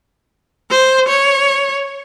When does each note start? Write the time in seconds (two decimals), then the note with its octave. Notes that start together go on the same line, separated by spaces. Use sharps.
0.70 C5
1.08 C#5